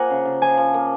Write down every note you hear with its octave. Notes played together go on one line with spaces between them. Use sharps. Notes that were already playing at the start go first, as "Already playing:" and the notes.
Already playing: F3 A#3 F#5 G#5 A#5
C#3
C#3
F3 G#5
F3
A#3